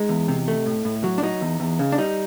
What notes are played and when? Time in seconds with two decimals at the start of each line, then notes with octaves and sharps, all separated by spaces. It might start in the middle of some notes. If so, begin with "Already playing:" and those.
Already playing: G#3 D#4
0.09 E2
0.28 C3
0.48 A3
0.66 A2
0.85 A2
1.04 F#3
1.18 D4
1.23 F#3 D#4
1.41 E2
1.60 E2
1.79 C#3
1.92 D4
1.98 G3 D#4